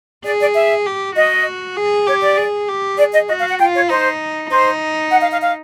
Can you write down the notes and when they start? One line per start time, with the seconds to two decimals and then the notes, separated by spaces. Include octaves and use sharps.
0.25 G#4 D5
0.40 D5
0.55 E5
0.86 G4
1.16 F#4 D#5
1.77 G#4
2.07 G4 C#5
2.22 D5
2.37 G#4
2.68 G4
2.98 G#4 D5
3.13 D#5
3.28 F#4 D#5
3.39 F5
3.49 F#5
3.59 F4 G5
3.75 C#5
3.90 D#4 C5
4.50 D#4 C5
5.12 F#5
5.21 F5
5.32 F5
5.42 F5